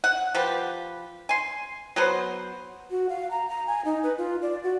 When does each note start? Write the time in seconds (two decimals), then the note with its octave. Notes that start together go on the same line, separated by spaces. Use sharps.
0.04 F#5
0.34 F3 G4 B4
1.29 G#5 C6
1.96 F#3 B3 C5
2.91 F#4
3.09 F5
3.31 A#5
3.49 A#5
3.67 G#5
3.85 D#4
4.03 B4
4.18 F4
4.42 D5
4.64 F#4